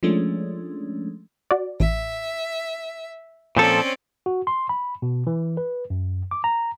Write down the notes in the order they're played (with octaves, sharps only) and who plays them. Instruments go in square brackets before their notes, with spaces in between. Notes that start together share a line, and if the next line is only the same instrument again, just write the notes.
[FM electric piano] F3 G#3 A3 C#4 D4
[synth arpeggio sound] F#4 D5
[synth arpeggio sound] A1 [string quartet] E5
[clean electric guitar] A#2 F3 A4 [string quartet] C4 C#4 D5
[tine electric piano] F#4
C6
B5
B2
E3
B4
F#2
D6
A#5